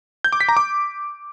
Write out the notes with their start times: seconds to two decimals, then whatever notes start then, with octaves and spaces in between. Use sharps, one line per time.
0.24 G6
0.32 D6
0.41 B6
0.49 A#5
0.57 D6